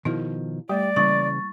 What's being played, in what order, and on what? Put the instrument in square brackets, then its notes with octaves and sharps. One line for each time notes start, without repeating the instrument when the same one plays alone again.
[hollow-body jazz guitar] B2 D#3 F3 [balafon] E4
[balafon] G3 A3 [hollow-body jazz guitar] G4 [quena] D5
[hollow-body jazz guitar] C#3 E3 [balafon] G3 A#3 E4 [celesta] C#6 A6